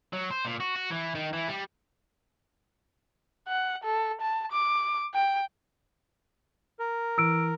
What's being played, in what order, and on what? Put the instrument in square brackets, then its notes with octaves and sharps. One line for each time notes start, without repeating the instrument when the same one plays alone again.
[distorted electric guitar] F#3
C5
A#2
F#4
F#4
E3
D#3
E3
G3
[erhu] F#5
A4
A5
D6
G5
[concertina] A#4
[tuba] E3 [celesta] E6 D7